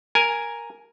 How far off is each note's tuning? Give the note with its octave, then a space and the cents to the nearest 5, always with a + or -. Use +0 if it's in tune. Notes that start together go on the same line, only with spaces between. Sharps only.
A#4 +0 G#5 +0